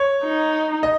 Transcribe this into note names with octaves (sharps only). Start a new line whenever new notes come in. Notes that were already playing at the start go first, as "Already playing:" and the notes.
Already playing: C#5
D#4
D#5